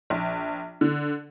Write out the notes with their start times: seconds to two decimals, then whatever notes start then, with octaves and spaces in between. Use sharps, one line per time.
0.10 A#1
0.81 D3